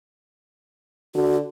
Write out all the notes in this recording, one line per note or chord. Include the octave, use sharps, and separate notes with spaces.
D3 F#4